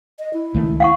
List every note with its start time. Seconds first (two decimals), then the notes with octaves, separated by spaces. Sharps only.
0.19 D#5
0.33 E4
0.54 C#2 D#3 A3
0.80 F5 F#5 C#6